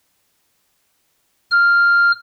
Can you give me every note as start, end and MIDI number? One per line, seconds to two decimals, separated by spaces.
1.51 2.12 89